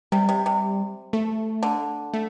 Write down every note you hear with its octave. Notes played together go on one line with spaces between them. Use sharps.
C3 G3
C3
C3
A3
D3
A3